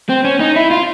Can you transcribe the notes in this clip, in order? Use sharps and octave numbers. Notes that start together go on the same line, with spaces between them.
C4
C#4
D#4
E4
F4